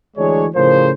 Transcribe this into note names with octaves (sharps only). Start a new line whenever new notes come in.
D2 E3 G#3 D4 G#4 C#5
A2 C#3 F3 C#4 A#4 C5